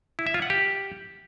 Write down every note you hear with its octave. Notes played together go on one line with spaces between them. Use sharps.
E4
E5
F4
F#5
G4